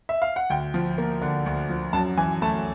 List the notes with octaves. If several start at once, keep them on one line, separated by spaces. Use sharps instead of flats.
E5
F5
F#5
D2 G5
F3
A#3
D3
D2
F3
F#2 A5
E3 G#5
A3 A5